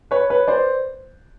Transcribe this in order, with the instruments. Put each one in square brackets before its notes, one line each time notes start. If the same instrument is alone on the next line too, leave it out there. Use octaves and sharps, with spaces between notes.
[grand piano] B4 C#5
B4 C#5
C5 D5